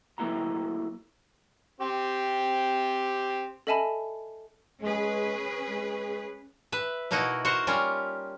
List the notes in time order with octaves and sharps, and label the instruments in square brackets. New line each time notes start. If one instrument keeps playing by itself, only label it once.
[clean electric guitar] F#3 A3 A#3 E4 F#4 A#5
[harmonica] C4 G4
[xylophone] A4 D#5 E5 G#5 A5 B5
[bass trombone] G#3 [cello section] C#4 G#4 B4
[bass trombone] G#3
[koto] B4 E5
B2 A#3 D#4 E4 F#4 D#5
F#4 A#4 C5 F#5
G3 C#4 F4 A#4